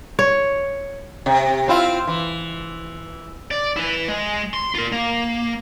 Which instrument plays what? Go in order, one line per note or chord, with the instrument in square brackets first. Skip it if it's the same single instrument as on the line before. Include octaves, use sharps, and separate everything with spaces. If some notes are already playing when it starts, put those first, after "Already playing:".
[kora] C#5
[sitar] C3
C4 E4 F4
E3
[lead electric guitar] D5
E4 B4
G#3
C6
F4 A#4
A#3